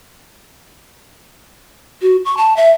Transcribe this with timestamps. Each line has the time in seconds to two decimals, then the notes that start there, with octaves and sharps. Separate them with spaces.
2.02 F#4
2.25 C#6
2.37 A5
2.57 E5